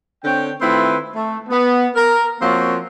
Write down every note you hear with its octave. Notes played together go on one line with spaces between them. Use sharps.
D3 C4 C#5 G5
D#3 A3 C4 E4 F4 B4
A3
B3
A#4
F3 A#3 C4 C#4 F4 F#4